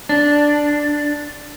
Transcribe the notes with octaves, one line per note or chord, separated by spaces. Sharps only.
D4